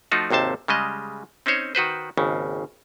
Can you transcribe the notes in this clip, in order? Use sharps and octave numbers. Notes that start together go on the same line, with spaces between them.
F3 A3 D#4 F4 F#4
G#1 D#2 C3 C5 A5
C#3 G3 G#3 D#5
C4 C#4 D#4 C5 C#5
D#3 F#4 B4 C5
G#1 D#2 C#3